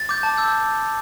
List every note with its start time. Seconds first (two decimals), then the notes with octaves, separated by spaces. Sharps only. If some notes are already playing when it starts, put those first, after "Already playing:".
Already playing: A6
0.09 D6 G6
0.23 A5
0.37 E6 G6